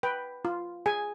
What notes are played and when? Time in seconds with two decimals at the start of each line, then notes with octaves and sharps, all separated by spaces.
0.03 B4 G5
0.45 F4
0.86 G#4 G#5